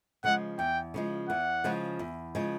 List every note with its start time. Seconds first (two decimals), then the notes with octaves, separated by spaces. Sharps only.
0.24 C#3 F3 G#3 F#5
0.58 E2 G5
0.94 C#3 F3 G#3
1.29 E2 F#5
1.64 C#3 F3 G#3
1.99 E2
2.35 C#3 F3 G#3